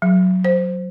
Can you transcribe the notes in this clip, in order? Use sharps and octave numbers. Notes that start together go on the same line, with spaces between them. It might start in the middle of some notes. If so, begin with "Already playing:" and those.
F#3
C5